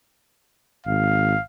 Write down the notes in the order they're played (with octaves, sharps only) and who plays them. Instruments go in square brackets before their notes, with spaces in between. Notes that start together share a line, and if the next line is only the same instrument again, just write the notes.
[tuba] G#1 [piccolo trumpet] F5